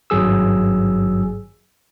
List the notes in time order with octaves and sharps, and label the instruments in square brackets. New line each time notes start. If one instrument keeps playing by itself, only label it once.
[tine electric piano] G#1 G2 F#3 G#4 E6